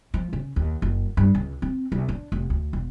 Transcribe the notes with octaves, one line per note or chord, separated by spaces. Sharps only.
F3
C#3
D#2
F#1
G2
C#2
C4
C2
D4
F1
D2
E1